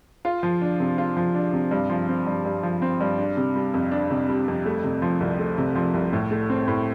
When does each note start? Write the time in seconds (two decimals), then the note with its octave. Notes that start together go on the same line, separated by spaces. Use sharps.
0.25 F4
0.43 F3
0.61 D4
0.80 C3
0.98 F4
1.17 F3
1.35 D4
1.53 C3
1.71 G2
1.90 F3
2.09 C4
2.26 G2
2.45 G2
2.63 F3
2.82 C4
3.01 G2
3.18 D4
3.37 C3
3.55 G3
3.74 F2
3.91 D4
4.10 C3
4.29 G3
4.48 F2
4.66 A3
4.84 C3
5.02 F3
5.21 C2
5.39 A3
5.58 C3
5.75 F3
5.94 C2
6.13 A2
6.31 A3
6.50 C4
6.68 A2